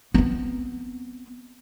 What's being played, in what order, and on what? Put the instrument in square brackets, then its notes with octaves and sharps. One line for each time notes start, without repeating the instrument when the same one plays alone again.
[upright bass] B3 C4